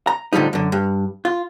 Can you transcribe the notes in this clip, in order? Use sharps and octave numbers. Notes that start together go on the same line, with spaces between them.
A#5
A2 D3 F3 G3 D#4
F#2 D3
G2
F4